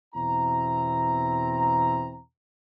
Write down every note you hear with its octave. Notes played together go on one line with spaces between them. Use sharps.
E2 B2 C4 E4 A#5